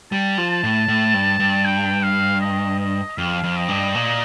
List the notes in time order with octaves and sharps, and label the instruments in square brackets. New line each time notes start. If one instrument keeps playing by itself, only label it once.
[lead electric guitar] G3 [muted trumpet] A5
[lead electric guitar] F3
[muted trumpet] A5
[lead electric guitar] A2
A2
G2
G2
[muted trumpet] G5
F5
D#5
D#5
[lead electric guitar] F2 [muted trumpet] F5
[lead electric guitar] F2
[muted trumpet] D#5
[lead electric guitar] G2
[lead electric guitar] A#2 [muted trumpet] D#5